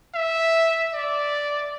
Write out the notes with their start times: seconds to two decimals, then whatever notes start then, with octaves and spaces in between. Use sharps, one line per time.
0.15 E5
0.94 D5